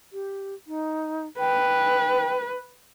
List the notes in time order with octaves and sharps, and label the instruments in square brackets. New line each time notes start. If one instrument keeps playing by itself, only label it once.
[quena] G4
D#4
[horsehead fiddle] B4 [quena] G5